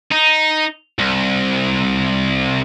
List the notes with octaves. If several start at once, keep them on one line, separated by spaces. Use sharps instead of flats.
D#4
C2